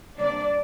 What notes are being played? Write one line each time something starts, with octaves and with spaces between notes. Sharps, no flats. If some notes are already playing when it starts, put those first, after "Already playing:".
C3 G3 A#3 D4 D5